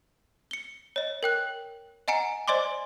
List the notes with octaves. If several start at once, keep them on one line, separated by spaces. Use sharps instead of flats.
C#7 G7
C#5 D#5
A#4 G5 F#6
D#5 F#5 G#5 A#5 C#7
C5 D5 D#5 G#5 C6 D6